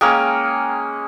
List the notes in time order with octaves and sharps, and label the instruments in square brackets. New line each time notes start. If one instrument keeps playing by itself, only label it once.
[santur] G#3 A#3 C#4 [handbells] G5 G#5 A#5